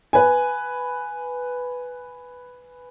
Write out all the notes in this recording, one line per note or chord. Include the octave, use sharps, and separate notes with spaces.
B4 G#5